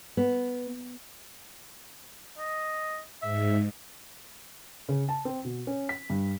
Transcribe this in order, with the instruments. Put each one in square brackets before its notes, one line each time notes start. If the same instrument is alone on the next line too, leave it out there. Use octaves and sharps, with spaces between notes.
[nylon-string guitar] B3
[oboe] D#5
[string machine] G#2 [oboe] E5
[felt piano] C#3
A5
C4
B2
C#4
B6
G2